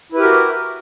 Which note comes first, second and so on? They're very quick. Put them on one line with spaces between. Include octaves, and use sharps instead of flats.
E4 B4 G4 A#4 F#4